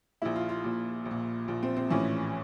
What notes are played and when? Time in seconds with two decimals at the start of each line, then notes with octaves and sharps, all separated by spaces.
0.22 A#1 A#2 E4
0.36 F4
0.49 F4
0.64 A#1 A#2
1.05 A#1
1.11 A#2
1.48 A#1 A#2
1.63 C4
1.76 C4
1.90 A#1 A2 E3 C#4